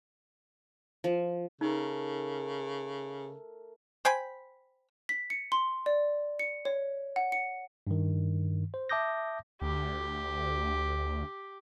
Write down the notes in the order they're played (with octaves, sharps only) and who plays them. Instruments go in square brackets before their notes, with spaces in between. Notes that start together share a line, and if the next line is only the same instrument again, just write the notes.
[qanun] F3
[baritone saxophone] C#3 [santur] A3 A#4 [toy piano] D#4
[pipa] C5 G5 G#5 B5
[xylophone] B6
C#7
C6
D5
C#7
C#5
F#5
C#7
[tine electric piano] G2 D#3
C5
E5 A5 D6 D#6 G6 A#6
[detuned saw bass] D2 [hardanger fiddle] G4